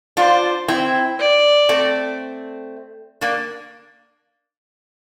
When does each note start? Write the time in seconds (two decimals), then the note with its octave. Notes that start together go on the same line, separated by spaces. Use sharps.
0.17 D4 F4 C5
0.68 C4 E4
1.19 D5
1.69 A3 C4
3.21 A#3 D4